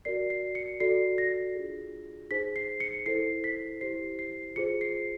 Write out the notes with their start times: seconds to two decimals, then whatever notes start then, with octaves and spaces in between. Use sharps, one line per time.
0.05 F#4 A#4 D5 C7
0.30 C7
0.55 C#7
0.80 F#4 A4 D5 C7
1.18 A#6
1.55 D4 F4 G#4
2.31 D#4 G#4 C5 B6
2.56 C7
2.80 C#7
3.06 E4 A4 C5 C7
3.44 B6
3.81 E4 G4 C5 C7
4.19 C7
4.56 F4 G#4 C5 C#7
4.81 C7